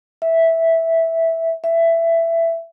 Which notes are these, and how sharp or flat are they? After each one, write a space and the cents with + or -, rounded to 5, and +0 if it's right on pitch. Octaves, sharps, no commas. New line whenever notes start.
E5 -5
E5 +15